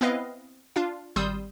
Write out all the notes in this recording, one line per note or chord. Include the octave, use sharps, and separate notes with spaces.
B3 C4 E4 B4 D#5 F5
D4 F4 F5
G#1 G3 C6 D#6 E6 G6